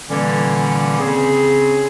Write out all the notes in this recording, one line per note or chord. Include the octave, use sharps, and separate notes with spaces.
A#2 D3 E3 G3 A#3 C#4
C#3 C4 C#4 G#4